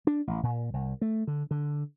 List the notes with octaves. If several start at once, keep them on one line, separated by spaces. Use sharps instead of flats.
D4
A1
A#2
C2
A3
D3
D3